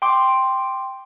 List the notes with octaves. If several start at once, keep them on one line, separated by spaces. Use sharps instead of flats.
G5 C6 D6